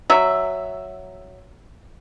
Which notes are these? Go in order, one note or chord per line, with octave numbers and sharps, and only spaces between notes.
F#3 E5